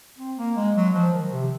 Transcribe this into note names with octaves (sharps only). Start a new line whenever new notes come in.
C4
A#3
G#3
F#3
F3
D#3
C3